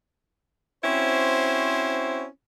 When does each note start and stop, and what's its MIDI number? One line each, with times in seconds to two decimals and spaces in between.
0.84 2.26 60
0.84 2.26 61
0.84 2.26 64
0.84 2.26 66
0.84 2.26 72